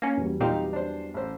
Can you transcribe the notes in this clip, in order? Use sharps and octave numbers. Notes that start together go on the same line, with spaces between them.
A#3 C#4
E2 F#3 G3
A#2 C4 D#4 G4 F5
D4 C5
A1 C5